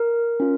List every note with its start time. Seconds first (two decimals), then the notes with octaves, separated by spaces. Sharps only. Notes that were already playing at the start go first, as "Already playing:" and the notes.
Already playing: A#4
0.40 C#4 F4